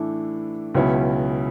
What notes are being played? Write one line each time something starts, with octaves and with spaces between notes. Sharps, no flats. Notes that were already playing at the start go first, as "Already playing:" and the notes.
Already playing: A2 E3 A3 D4
C#2 B2 F#3 C#4 E4